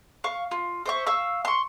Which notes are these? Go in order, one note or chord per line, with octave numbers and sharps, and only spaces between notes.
F5 C#6
F4
C5 E5 C#6
F5 C#6 E6
C6 C#6